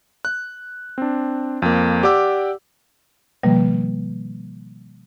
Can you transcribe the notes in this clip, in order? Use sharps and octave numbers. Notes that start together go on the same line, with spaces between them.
F#6
C4 D4
F2 A#3
G4 D5 F#5 D6 E6
B2 D#3 F3 G3 A#3